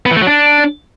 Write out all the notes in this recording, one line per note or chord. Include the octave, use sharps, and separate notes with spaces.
B3
E3
A3
F#3
D4